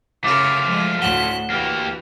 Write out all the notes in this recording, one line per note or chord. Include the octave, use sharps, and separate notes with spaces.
C#3 A3 F4 A#4 D6
F3 G#3
D2 A2 F#5 F#6 E7 G7
D2 E3 A#3 G4